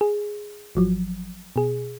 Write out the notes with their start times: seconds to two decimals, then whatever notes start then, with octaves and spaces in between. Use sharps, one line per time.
0.01 G#4
0.75 G#1 F3 F#3
1.56 B2 G#4